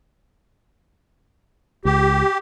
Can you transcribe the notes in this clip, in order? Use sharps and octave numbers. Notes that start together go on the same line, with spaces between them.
C#2 G4